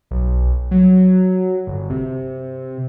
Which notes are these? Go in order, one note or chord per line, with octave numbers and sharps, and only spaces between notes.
B1
F#3
G1
C3